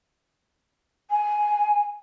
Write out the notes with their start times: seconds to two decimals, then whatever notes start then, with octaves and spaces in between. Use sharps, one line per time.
1.10 G#5